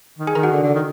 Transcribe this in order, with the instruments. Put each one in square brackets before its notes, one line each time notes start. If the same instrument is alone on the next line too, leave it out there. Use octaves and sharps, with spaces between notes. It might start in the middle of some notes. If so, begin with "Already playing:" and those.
[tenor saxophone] D#3
[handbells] G#4 G#5
[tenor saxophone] D#3 [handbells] A#4 A#5
[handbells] F#4 F#5
[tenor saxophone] D3
D3
D#3